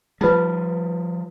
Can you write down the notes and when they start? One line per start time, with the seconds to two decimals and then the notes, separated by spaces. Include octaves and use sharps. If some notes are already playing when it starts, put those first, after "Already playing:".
0.21 F3 G3 D#4 F4 B4